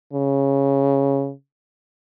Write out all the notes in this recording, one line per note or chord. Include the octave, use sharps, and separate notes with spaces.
C#3